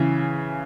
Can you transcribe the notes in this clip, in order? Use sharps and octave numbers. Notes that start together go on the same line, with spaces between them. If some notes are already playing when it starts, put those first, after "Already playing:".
Already playing: C#3 E3